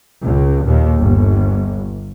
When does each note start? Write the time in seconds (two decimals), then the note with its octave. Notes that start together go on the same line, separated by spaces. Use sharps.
0.22 C#2
0.63 D#2 A#2
1.00 G1